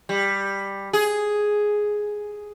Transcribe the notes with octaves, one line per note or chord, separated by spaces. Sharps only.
G3
G#4